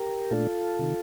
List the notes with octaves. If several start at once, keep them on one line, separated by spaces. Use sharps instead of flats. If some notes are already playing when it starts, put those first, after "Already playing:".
Already playing: G4 A#4
A#2 A3 D4 F4 A4
C3 D#3